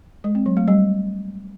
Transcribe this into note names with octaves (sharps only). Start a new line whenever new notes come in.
G#3
C4
F#3
A3
G3